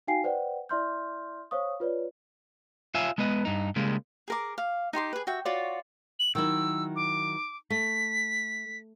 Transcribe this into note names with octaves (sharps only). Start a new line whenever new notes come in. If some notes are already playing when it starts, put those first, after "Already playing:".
D#4 F#4 F5 G5 G#5 C7
B4 C5 D5 F#5 G5
E4 D5 E5 C6 F6 G6
C5 C#5 F5 C#6 D#6
F4 B4 C#5 D5
F4 C#5 E5 F5 G#5
G#3 B3 B4 D#5
G2 D#4
C#3 G3 G#3 A#3
G#4 A#4 D6
F5
D#4 G4 C6 D6
G#4 B4
F#4 E5 G5
F4 F#4 C#5 D5
F#7
D#3 F#3 E4 E6
D6
A3 B6